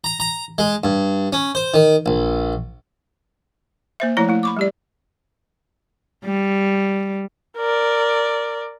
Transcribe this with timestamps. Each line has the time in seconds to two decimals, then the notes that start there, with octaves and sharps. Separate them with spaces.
0.04 A#5
0.20 A#5
0.58 G#3
0.84 G2
1.33 C#4
1.55 C5
1.74 D#3
2.06 A#1
4.00 A#3 C5 E5
4.17 F3 A3 E4 C#5 A#5
4.28 A3 E4
4.43 B5 C#6 D6
4.57 G3 G4 D5
6.25 G3
7.58 A#4 D5